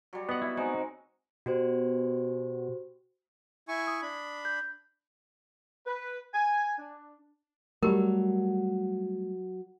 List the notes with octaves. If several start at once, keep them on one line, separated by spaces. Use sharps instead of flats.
F#3 G3
B3 D#5 F#5
E4
G#3 C4 D#4 F#4
B2 F#4 G4 C5
E4 G#5 C#6
D#6
D4 B5
G6
B4
G#5
D4
F#3 G3 A3 G4 A#4